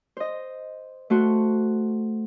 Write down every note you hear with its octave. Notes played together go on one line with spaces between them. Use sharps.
C5 D#5
A3 F#4 C5